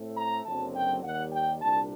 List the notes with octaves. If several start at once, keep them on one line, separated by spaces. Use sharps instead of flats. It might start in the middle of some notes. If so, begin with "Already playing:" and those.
Already playing: A2 A3 C4
A#5
F#1 F#2 D3 F#3 C4 A5
G5
D#2 D#3 G3 F#5
G5
C2 A#2 G3 D4 A5